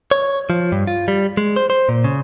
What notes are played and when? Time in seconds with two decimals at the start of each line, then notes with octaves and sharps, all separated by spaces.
0.11 C#5
0.50 F3
0.72 G2
0.87 F4
1.08 G3
1.37 G#3
1.56 C5
1.70 C5
1.89 A#2
2.04 C#3